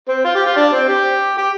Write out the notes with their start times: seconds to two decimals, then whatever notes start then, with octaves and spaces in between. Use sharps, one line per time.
0.08 C4
0.25 F4
0.35 G4
0.46 F4
0.56 D4
0.73 C4
0.88 G4
1.38 G4